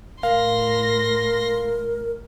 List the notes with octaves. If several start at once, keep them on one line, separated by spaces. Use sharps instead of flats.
A2 A#4 F5 C6 A#6